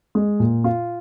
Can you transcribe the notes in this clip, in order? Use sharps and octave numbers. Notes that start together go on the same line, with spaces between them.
G#3
A#2
F4